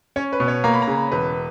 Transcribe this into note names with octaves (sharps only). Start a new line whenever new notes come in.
C#4 C#5
B4
B2
C#5
A#3 A#5
B5
A#5
C#3
E1 B4